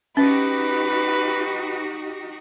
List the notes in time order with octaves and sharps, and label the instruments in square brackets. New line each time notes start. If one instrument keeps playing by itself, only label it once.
[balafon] C#4 [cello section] D#4 F#4 G4 [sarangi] B4